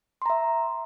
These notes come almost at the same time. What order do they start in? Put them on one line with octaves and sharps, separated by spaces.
C6 A#5 E5